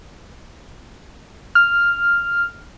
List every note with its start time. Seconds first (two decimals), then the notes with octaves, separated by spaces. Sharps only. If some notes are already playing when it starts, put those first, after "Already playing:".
1.55 F6